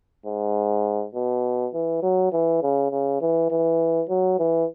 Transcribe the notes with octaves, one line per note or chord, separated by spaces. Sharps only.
G#2
B2
E3
F#3
E3
C#3
C#3
E3
E3
F#3
E3